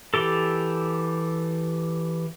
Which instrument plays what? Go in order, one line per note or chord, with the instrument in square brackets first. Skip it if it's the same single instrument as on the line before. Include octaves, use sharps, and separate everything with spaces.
[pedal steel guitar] E3 G4 A4